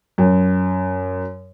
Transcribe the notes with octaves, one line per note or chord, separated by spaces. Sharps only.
F#2